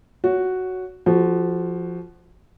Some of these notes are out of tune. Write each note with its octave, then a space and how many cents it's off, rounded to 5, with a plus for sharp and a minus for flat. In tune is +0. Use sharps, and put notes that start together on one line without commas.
F#4 +0 C#5 +15
F3 -5 F#4 +10 A4 -45